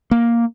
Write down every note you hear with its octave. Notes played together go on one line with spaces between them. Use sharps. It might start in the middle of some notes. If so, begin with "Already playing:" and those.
A#3